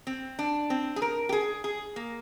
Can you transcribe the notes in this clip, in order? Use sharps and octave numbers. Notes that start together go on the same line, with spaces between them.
C4
D4
C4
G#4
A#4
G4
G#4
G#4
A#3